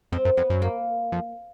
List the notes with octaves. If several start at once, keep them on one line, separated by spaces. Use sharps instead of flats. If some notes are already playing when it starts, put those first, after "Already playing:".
F2 C4
F#2
F2 B3
F#2
A#3
F2